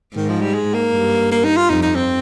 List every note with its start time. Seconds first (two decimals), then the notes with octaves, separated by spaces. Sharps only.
0.16 G#2 D#3
0.29 F3
0.41 G3
0.54 G#3
0.74 A#3
0.92 G2
1.31 A#3
1.44 D#4
1.57 F4
1.70 F2 D#4
1.82 D#4
1.95 C4